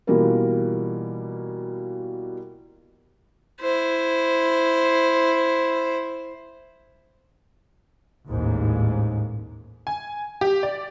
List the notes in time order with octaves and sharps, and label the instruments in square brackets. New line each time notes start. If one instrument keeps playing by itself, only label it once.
[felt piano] B2 E3 G3 A#3 F4 A#4
[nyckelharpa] E4 C5
[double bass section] A1 D#2 G#2
[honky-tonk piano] G#5
G4
D5